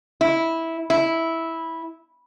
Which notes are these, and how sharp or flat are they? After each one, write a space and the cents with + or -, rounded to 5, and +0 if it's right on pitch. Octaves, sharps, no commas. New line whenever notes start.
E4 -10
E4 -10